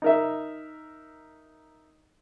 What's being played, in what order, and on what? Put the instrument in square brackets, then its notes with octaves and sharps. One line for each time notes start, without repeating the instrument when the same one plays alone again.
[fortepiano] D#4 A#4 E5